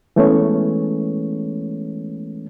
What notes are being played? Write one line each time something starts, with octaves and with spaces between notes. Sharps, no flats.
E3 G#3 A3 B3 C#4 C#5